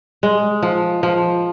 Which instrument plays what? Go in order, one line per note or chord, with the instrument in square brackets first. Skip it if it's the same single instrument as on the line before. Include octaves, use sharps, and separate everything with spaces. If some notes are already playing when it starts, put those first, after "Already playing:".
[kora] G#3
F3
F3